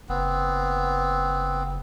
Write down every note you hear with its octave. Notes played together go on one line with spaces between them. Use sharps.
F#1 B3 C4